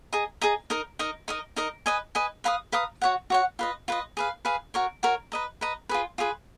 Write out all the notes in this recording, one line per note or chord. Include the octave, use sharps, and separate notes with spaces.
G#4 D#5 A#5
G#4 D#5 A#5
D#4 A#4 D#5
D#4 A#4 D#5
D#4 A#4 D#5
D#4 A#4 D#5
B4 D#5 G#5
B4 D#5 G#5
B4 F5 A#5 D#6
B4 F5 A#5 D#6
F#4 C#5 F#5
F#4 C#5 F#5
F4 B4 D#5
F4 B4 D#5
G#4 B4 F5
G#4 B4 F5
F#4 A#4 C#5
F#4 A#4 C#5
B4 D#5 A#5
B4 D#5 A#5
F4 G#4 B4
F4 G#4 B4